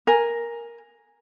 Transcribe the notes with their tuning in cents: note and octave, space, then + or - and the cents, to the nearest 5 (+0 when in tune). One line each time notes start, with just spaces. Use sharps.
A#4 +5 G#5 -5